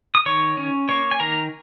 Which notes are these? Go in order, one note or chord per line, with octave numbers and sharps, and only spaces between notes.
D#6
D#3 C#5 C#6
C#4
A#3 C#5 C#6
G#5
D#3 A#4 A#5